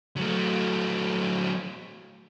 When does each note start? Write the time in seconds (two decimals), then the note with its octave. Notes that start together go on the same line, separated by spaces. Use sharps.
0.17 F#3 A3